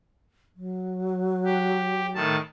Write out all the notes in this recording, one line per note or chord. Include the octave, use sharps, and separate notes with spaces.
F#3
G4
A2 D#3 A5